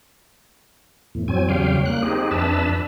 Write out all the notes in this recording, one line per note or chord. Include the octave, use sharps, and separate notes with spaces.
E2 A2
F2 F#3 C4 G#5
E2 C#3 F#3 G3 F5 G5
A#3 F#6
C4 D#4 G4 G#4
F2 D4 B4 E5 A5